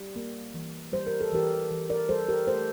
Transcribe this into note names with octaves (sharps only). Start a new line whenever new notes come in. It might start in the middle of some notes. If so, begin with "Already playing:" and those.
Already playing: G3
A#3
E3
G3 C5
A#4
A4
E3 G4 A#4
E3
A#4 D5
G3 A4 C5
G4 A#4
A3 A4 C5